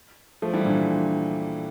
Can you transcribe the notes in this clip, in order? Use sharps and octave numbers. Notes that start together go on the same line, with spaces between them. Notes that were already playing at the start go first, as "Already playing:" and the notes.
F3 A3
E3 G3
A#2 D3